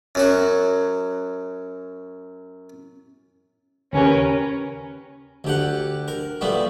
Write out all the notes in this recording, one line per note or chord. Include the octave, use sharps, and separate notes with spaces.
F#2 F#3 F#4
D#2 C#3 C#4 G4 A#4 B4
D2 G4 F#5
A#4
A#2 G3 A3 B3